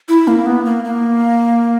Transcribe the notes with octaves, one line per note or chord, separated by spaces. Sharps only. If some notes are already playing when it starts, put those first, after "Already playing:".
E4
A#3
B3
A#3
A#3